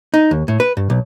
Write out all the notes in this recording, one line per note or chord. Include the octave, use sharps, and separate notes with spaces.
D#4
D#2
A2
B4
G2
B1